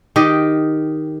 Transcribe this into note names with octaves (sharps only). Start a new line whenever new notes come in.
D#3 G4 D#5